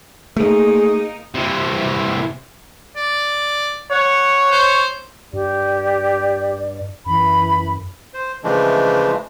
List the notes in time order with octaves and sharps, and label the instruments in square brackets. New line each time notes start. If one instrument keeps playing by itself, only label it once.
[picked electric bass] A3 [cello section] A#3 D#4 [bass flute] G#4
[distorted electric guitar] C3 E3
[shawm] D5
[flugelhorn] C#5 [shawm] F#5
[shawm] C5
[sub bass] G2 [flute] G4 [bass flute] D5
[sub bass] F#2 [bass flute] E3 [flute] B5
[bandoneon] C5
C#3 E3 F3 G#3 A3 D4